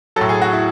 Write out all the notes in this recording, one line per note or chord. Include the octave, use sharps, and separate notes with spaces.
A2 F#3 A4
G#4
F#4
E4